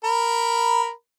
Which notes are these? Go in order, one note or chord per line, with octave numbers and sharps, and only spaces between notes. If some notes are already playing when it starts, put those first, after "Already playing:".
A#4 A#5 B5